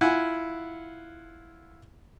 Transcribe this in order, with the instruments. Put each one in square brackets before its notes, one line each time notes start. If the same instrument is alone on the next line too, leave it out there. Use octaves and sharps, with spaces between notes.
[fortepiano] E4 F4 F#5 G#5